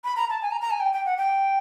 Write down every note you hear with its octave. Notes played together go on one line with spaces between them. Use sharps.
B5
A#5
A5
G#5
A#5
A#5
G#5
G5
G5
F#5
G5